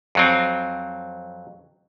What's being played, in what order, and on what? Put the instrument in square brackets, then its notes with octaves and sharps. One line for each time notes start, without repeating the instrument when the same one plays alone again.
[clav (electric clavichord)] F2 F#3 C4